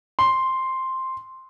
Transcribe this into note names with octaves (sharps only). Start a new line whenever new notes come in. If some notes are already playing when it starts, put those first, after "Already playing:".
C6